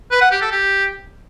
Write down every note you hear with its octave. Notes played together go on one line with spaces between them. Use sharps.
B4
F#5
G4
A4
G4